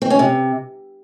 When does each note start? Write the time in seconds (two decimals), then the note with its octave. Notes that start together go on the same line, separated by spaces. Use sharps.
0.02 C4
0.10 C#4
0.19 C3